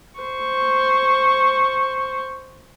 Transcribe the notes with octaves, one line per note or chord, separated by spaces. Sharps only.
C5 C#6